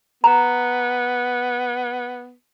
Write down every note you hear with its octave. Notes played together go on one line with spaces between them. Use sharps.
B3 A#5